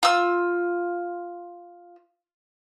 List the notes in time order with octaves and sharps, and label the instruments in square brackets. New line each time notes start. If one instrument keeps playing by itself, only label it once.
[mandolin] F4 E6